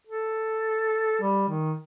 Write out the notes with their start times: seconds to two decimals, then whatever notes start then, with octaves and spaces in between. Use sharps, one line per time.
0.07 A4
1.22 G3
1.48 D#3